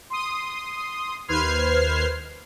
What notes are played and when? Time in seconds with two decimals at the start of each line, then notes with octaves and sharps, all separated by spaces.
0.10 C6 D#6
1.28 D#2 B4 C5 F6 G#6 C7